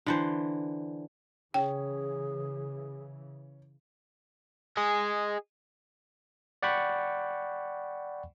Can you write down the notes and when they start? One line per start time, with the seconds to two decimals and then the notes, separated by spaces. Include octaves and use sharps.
0.06 D3 E3 C5
1.54 C#3 E3 C#4 G#4 G5
4.77 G#4 D#5
6.63 D5 F#5 G5 B5 C#6